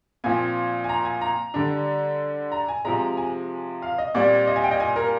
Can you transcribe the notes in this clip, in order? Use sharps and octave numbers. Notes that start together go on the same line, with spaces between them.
A#2 F3 C4 G#5
G#5
A#5
G#5
A#5
D3 G3 D4
A#5
G#5
C3 F3 G#3 A#5
G#5
F5
D#5
A#2 G3 C4 D5
D#5
G#5
G5
D#5
G#5
A#4